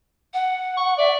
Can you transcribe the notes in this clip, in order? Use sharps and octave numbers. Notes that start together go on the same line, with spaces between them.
F#5
C#6
D5 E5